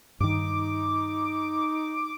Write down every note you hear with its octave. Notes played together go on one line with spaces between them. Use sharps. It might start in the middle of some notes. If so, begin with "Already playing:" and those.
G2 D#3 D#4 D6